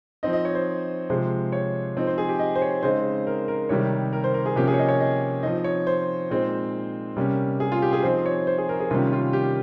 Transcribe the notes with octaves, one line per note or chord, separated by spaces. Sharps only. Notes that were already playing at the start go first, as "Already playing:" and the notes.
F3 C4 D#4 D#5
D#5
C#5
C5
C3 F3 G#3 C5
C#5
F3 C4 D#4
C5
G#4
G4
D#5
C5
C#5
C#3 G#3 C4 D#4 C5
A#4
A#4
C3 D#3 G3 C#5
A#4
C5
A#4
G#4
C3 F3 A#3 C#4 G4
G#4
C#5
D#5
C#5
D#5
F3 C4 D#4 D#5
C#5
C5
A#2 G#3 C4 D#4
C3 G3 A#3 C#4
G#4
F4
G4
G#4
F3 C4 D#4 C5
C#5
C5
G#4
A#4
G#4
C3 D#3 G3 A#3 C#4 F4
F4
G4